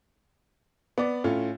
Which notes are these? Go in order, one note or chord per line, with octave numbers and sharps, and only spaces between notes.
B3 D5
A2 C#4 F4